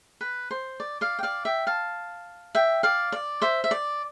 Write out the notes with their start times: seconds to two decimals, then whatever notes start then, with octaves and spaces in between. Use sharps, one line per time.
0.21 B4
0.51 C5
0.80 D5
1.01 D5 F5
1.19 G5
1.23 D5 F5
1.45 E5 G5
1.67 F5 A5
2.55 E5 G5
2.83 D5 F5
3.12 D5
3.42 C5 E5
3.64 E5
3.71 D5